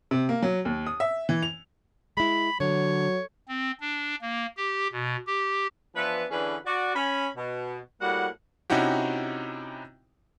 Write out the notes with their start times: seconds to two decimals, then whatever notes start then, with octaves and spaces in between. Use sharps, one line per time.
0.11 C3
0.29 A#3
0.42 F#3
0.65 D#2
0.86 D#6
1.00 E5
1.29 E3
1.43 F7
2.17 G#3 E4 B5
2.60 D3 F#3 C#5
3.48 C4
3.80 D4
4.22 A#3
4.57 G4
4.92 B2
5.27 G4
5.96 E3 F3 B3 D4 B4
6.31 D3 E3 C#4 D4 G#4 B4
6.66 F#4 D5
6.96 C#4 B5
7.36 B2
8.01 A2 G3 A#3 F#4 F#5
8.70 C3 C#4 D#4 E4 F#4 G4